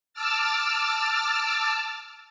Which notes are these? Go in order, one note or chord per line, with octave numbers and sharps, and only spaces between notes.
A5 D6 E6 F6 A6